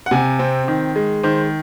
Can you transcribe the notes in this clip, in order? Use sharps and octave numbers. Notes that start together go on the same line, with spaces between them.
F#5
C3 G#5
C4
D#3
G#3
D#3 C5